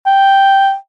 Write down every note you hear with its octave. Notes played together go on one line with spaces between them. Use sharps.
G5